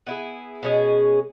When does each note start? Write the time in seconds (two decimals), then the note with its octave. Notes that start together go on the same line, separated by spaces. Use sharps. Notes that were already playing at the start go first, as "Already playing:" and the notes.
0.07 B3 E4 G#4
0.63 B2 G#3 C#4 G#4